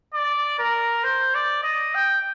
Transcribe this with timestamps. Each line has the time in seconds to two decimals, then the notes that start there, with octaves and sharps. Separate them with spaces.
0.14 D5
0.59 A#4
1.04 C5
1.35 D5
1.63 D#5
1.94 G5